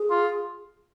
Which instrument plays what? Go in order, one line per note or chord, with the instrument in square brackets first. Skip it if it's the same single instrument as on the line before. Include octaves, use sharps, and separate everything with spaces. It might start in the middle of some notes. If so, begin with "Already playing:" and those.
Already playing: [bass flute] G#4
[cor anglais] F4